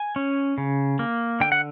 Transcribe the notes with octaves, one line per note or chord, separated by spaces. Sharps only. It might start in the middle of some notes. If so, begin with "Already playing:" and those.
Already playing: G#5
C#4
C#3
A#3
D3 G5
F#5